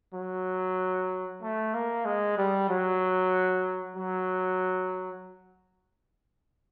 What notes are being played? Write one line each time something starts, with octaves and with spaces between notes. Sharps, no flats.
F#3
A3
A#3
G#3
G3
F#3
F#3